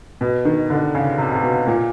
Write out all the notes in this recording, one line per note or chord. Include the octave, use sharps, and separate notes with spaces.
B2
D#3
D3
C#3
C3
C3
B2
A#2